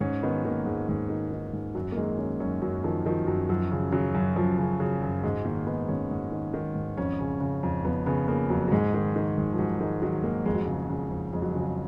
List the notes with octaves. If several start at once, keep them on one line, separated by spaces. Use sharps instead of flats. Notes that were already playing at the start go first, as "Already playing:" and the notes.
G#2 C#4
D#3 B3
D#3 A#3
G#2 G#3
G#2
D#3
D#3
G#2
F#2 F#3
A#3
D#3 G#3
D#3 C#4
F#2 C#4
F#2 F#3
D#3 F3
D#3 F3
F#2 F#3
F#2 F3
C#3
C#3 F#3
F#2
F#2 F3
C#3
C#3 F#3
F#2
G#2 G#3
D#3 A#3
D#3 B3
G#2 C#4
G#2
D#3
D#3
G#2
F2 C#4
C#3
C#3
F2
F2 B3
C#3 B3
C#3 A#3
F2 F#3
F#3
G#2 G#3
D#3
D#3
G#2
F3
G#2 F#3
D#3 G#3
D#3 F#3
G#2 A#3
F2 G#3
F#3
C#3 G#3
C#3
F2
F2 G#3
F#3
F3
C#3 F#3